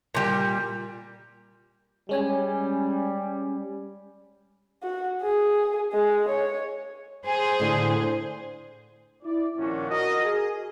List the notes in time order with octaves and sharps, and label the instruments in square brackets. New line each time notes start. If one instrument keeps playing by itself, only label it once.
[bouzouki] A#2 G3
[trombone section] G3 [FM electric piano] G#3 C#4 G#5
[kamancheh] F#4
G#4
G#3
C#5
[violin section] G#4 [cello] C5
[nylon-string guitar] A2 D3
[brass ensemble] E4 D5
A#1 D#2 A#2 C#4 D4 F#4
F#4 A#4 D#5
G#4